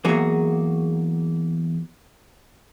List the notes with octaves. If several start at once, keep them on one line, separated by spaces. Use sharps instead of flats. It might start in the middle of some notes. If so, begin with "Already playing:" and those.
E2 F#3 A#3 F#4 G#4